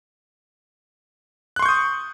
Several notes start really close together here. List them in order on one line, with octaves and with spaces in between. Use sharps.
F#6 C6 C#6 G6 D#6